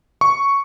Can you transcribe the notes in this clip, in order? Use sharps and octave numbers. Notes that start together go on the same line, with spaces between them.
C#6